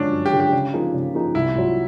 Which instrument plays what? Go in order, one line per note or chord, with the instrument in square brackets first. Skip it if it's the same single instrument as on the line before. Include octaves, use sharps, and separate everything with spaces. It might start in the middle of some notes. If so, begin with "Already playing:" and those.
Already playing: [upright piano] F#2 D3 F3 G#3 [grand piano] C#4 D4
[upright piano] F#2
[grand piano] G4
[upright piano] D3 F3 G#3
[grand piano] G4
[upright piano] C#3
F3 A#3 D#4 G#4
C#3
F3 A#3 D#4 G#4
[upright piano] C2 [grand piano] E4
[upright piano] A#2 F#3